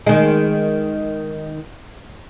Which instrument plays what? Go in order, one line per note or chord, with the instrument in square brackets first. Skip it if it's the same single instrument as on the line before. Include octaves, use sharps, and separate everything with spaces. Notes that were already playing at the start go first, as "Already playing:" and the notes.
[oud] D#3 G#3